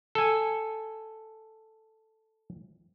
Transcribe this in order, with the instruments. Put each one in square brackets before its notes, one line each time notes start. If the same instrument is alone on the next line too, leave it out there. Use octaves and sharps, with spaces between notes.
[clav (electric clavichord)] A4 G#5